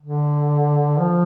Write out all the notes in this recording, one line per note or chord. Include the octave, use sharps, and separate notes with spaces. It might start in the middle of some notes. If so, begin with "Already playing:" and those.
D3
F3